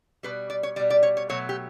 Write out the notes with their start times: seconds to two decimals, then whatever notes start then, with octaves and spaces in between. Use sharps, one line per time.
0.23 B2 G3 B4
0.50 D5
0.63 C#5
0.76 B2 G3 D5
0.90 D5
1.03 C#5
1.17 C#5
1.29 B2 F#3 A3 C#5
1.49 G4